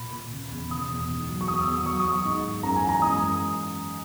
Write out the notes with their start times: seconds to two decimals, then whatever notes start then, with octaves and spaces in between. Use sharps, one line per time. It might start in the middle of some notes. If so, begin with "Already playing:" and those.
Already playing: A#2 B5
0.13 A#2
0.32 C#3
0.52 E2
0.70 B2 D#6
0.90 E2
1.10 G#2
1.29 F#3
1.41 C#6
1.48 E2 D#6
1.61 E6
1.67 E2
1.74 D#6
1.86 F#3 C#6
2.00 D#6
2.06 F#3
2.12 C#6
2.25 G#2
2.44 G#2
2.63 F#2 A#5
2.76 G#5
2.83 E3
2.89 A#5
3.02 G#3 D#6
3.22 F#2